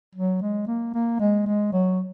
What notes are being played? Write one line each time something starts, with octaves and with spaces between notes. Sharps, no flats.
F#3
G#3
A#3
A#3
G#3
G#3
F#3